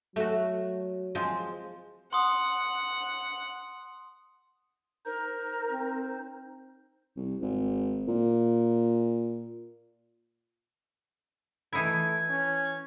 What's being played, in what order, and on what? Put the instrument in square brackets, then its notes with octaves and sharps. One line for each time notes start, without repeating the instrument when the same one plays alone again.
[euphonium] F#3 [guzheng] A3 F#4
[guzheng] F3 G#3 C4
[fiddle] F#5 [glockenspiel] C6 D#6
[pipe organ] D#4 C5 [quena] A#4
[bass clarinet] C4
[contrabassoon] C2
G#1
A#2
[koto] E3 D#4 E4 [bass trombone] A3 [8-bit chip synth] G#6
[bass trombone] C#4